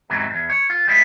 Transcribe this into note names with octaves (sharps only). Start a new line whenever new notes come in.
E2 G#2 C3 E3 F#3
E2 G#2
C#5
F4
G3 G#3 E4 F4